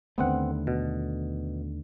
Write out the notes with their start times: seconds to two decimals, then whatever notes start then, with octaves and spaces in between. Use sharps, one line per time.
0.18 D#2 D3 A3 B3 C4 F#5
0.67 B2